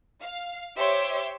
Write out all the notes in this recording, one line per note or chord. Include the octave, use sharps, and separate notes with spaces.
F5
G4 C5 C#5 E5 C6 D6